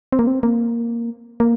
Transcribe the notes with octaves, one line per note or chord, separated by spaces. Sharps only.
C4
A#3
C4
A#3
A#3